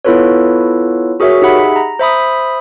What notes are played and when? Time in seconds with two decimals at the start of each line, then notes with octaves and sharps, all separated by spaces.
0.05 B3 E4 F4 A4 B4 C#5
1.20 F#4 G#4 A#4 C#5 E5
1.42 D#4 G4 G#4 E5 F#5 B5
1.76 A#5
1.99 C5 E5 B5 D#6